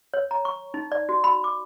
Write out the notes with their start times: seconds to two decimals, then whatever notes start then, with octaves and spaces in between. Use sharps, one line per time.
0.14 C#5
0.31 A#5
0.45 C#6
0.74 D#4
0.92 D5
1.09 F#4
1.24 B5
1.44 D6